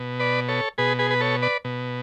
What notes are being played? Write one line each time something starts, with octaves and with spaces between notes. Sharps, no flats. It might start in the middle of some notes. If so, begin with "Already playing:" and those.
Already playing: B2
B4 D5
A4 C#5
B2 G#4 B4
G#4 B4
B4
A4 C#5
B4 D5
B2